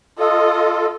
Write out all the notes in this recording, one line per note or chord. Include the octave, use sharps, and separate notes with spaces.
F4 A4 D#5